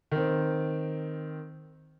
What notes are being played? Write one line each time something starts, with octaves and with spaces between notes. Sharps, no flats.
D#3 C4